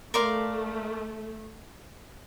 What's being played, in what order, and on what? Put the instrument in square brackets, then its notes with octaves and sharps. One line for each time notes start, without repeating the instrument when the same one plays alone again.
[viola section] A3 [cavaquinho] A#4 D5 F5 C6